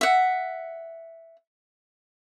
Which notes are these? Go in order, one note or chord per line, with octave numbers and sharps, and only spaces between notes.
E5 F#5